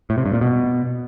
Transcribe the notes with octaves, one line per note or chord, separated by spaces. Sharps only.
A2
C3
G2
A#2
B2